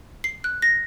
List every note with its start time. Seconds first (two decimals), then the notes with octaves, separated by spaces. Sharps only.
0.24 C7
0.44 F#6
0.62 A#6